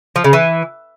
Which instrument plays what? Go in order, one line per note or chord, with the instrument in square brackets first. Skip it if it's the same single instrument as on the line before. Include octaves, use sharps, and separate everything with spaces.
[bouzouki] F3
C#3
E3